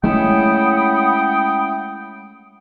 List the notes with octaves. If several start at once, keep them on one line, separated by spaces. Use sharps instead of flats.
G#3 A3 C#4 E4 F#5 G5 B5 D#6